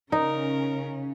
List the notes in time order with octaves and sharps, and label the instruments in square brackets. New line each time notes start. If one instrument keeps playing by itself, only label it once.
[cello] C#3 C#4 [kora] D#4 [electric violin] A#4